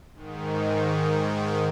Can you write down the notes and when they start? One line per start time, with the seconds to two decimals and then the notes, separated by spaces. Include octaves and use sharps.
0.13 G#2 D#3